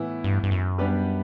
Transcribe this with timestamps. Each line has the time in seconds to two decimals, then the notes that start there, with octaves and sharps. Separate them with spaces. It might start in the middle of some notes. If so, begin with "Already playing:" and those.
Already playing: A2 E3 B3 E4
0.24 G2
0.43 G2
0.51 F#2
0.78 G3 B3 D4 G4 B4